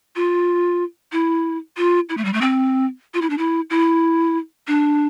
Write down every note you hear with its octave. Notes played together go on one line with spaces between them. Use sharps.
F4
E4
F4
E4
A3
G3
A3
C4
F4
E4
D4
E4
E4
D4